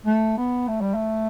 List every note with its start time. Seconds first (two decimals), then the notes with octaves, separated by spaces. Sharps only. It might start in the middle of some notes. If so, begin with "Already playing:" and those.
0.06 A3
0.37 B3
0.68 A3
0.81 G3
0.94 A3